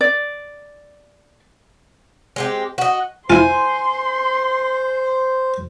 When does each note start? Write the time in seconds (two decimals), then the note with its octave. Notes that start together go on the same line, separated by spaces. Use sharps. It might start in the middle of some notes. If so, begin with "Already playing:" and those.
0.01 D5
2.36 G#3 C4 G4
2.78 F#4 D#5
3.30 E4 F4 C5 G#5 C6